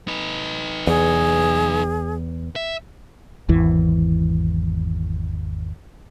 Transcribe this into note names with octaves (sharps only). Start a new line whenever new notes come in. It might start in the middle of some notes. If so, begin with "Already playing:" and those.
D#4 B4
E2 G#4
E5
G#1 E2 E3